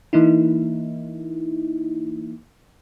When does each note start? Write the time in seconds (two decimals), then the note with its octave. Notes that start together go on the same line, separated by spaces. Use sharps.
0.13 E3 A#3 D#4 E4